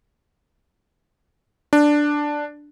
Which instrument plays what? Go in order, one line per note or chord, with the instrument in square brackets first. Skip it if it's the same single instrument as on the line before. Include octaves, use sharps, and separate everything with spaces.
[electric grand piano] D4